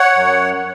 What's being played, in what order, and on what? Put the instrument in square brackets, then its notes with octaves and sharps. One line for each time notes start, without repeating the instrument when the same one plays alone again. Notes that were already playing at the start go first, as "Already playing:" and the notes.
Already playing: [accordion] C#5 F#5
F#2